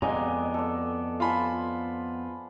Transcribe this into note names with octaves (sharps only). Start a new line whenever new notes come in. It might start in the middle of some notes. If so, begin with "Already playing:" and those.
F2 G#3 B3 D5 D#5 G#5 A#5
A4 D5
F4 C5 G#5 A5 B5